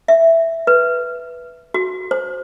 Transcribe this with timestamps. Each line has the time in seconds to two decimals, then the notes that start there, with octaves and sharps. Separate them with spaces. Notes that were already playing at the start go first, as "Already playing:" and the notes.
0.08 E5
0.67 B4
1.74 F#4
2.11 C5